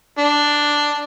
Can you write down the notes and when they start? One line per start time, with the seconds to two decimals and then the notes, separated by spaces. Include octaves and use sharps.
0.18 D4